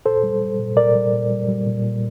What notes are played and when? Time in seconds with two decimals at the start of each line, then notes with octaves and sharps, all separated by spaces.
0.06 A#2 A4 C5
0.23 G3
0.41 G3
0.59 A#2
0.76 A#2 A#4 D5
0.95 G3
1.13 A#2
1.31 G3
1.49 G3
1.66 A#2
1.84 A#2